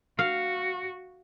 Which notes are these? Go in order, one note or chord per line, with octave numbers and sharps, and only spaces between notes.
F#4 F5